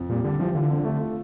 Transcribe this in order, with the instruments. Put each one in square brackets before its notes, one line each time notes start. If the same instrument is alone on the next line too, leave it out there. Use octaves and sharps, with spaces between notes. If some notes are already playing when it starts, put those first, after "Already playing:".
Already playing: [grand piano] F2
[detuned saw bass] A#2 [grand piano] G3
[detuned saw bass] D3 [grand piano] G3
[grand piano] E3 [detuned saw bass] F3
[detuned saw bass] D3 [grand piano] F4
[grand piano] C4
A3
F4